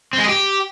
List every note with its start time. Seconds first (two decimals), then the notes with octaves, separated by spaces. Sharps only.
0.13 C4
0.18 G#3
0.24 G#4
0.29 G4